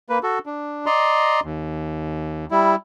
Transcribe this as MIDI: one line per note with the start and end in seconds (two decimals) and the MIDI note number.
0.10 0.19 58
0.10 0.19 71
0.23 0.39 66
0.23 0.39 69
0.46 0.86 62
0.86 1.40 74
0.86 1.40 75
0.86 1.40 82
0.86 1.40 84
1.44 2.45 39
2.51 2.75 55
2.51 2.75 64